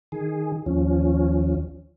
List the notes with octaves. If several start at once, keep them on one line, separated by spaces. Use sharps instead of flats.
D#3 G#4
D#2 F3 C#4